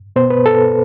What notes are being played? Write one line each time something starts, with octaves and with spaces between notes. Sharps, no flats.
B2 B3 C5
B4
A4